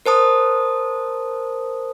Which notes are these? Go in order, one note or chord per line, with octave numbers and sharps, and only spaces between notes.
A#4 C5 A5 D#6